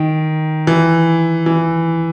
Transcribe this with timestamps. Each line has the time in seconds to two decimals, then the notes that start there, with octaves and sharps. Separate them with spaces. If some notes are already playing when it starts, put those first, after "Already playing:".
Already playing: D#3
0.67 E3
1.46 E3